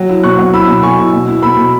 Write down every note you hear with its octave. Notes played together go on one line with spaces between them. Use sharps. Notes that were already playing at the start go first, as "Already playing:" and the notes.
Already playing: F#3
E4
B2 C#6 F#6
F#3
E4 B5 E6
B2
B2 G#5 C#6
E4
B2
E4
B2 B5 E6
B2